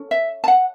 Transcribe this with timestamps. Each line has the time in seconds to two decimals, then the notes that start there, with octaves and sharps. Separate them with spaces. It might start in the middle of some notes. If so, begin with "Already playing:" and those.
Already playing: C#4 A4
0.11 E5
0.44 A5
0.48 F#5